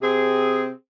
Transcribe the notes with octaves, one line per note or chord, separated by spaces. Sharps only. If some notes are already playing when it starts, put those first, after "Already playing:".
C3 C4 G#4